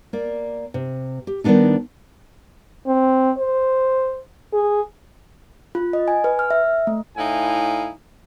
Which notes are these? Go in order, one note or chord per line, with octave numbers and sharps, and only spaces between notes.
A#3 D5
C3
G4
D#3 G3 A#3 B3 D4 D#4
C4
C5
G#4
F4
D#5
G#5
B4
F6
E5
A3
A2 D#4 E4 F5 G#5